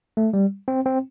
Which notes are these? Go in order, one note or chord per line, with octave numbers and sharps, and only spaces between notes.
A3
G3
C4
C4